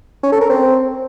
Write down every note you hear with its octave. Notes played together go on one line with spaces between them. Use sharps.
C#4
A4
A#4
C4